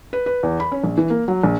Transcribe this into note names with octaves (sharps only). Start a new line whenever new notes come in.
B4
B4
E2
B5
C#4
A#1
E3
A#3
F#3
A#1